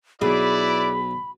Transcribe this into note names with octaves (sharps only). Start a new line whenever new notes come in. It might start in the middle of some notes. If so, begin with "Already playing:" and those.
B1 E4 G#4 B4 D5 B5